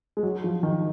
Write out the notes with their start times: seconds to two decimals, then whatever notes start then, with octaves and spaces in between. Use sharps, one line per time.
0.17 G#3
0.23 F#3
0.44 F3
0.63 D#3